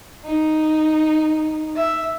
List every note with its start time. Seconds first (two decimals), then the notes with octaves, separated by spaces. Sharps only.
0.25 D#4
1.76 E5